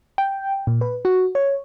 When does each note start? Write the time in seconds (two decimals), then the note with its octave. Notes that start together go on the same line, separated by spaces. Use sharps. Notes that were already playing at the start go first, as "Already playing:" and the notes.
0.18 G5
0.67 A#2
0.81 B4
1.05 F#4
1.35 C#5